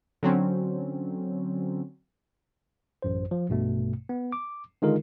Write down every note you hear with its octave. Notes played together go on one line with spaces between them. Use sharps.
D3 F#3 C4 C#4
A1 F#2 C5
F3
A#1 G2 B2 A3
B3
D6
D3 D#3 G#3 D#4 F4 A#4